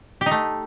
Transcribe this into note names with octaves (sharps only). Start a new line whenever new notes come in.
G4
D#4
A3